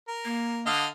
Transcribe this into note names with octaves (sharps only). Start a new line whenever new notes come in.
A#4
A#3
D3 D#5 F5